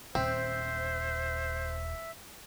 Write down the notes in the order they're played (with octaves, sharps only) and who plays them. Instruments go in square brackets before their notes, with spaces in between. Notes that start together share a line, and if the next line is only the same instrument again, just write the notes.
[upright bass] D#1 [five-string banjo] C4 [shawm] C5 [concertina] E5